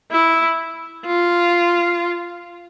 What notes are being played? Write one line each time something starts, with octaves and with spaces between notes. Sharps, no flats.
E4
F4